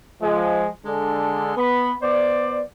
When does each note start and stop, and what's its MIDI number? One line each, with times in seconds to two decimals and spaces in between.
0.23 0.69 53
0.23 0.69 56
0.86 1.53 50
0.86 1.53 56
0.86 1.53 62
0.86 1.53 68
0.86 1.53 69
1.57 1.93 59
1.57 1.93 83
2.03 2.62 59
2.03 2.62 72
2.03 2.62 74